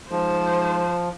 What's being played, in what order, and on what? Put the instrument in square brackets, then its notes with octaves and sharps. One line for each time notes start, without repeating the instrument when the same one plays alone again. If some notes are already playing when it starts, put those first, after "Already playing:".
[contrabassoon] G#2 [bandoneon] F3 [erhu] C5